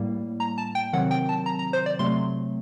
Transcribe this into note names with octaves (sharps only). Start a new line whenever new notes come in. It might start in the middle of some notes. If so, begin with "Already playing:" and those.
Already playing: A2 G3 A#3
A#5
A5
G5
C3 D#3 F#3 C4 F#5
G5
A5
A#5
A#5
C5
D5
C3 F#3 A3 C4 C6